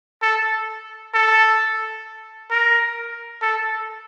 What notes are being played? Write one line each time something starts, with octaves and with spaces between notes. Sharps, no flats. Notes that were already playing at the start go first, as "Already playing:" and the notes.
A4
A4
A#4
A4